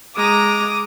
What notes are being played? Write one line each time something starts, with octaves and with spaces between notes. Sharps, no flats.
G#3 A#5 D6 D#6